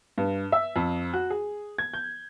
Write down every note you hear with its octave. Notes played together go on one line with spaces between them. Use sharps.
G2
E5
F2
F#4
G#4
G#6
G6